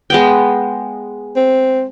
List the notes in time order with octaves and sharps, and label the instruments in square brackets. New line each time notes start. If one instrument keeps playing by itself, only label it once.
[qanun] G#3 B3 G5
[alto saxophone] C4